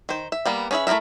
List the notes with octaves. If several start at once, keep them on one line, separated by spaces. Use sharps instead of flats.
D#3 C5
E5
G3 A#3 B3
C#4 D4 G#4 B4 E5
A3 E4 G#4 A#4 E5